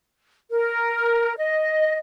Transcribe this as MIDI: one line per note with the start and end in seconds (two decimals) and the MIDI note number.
0.51 1.34 70
1.37 1.97 75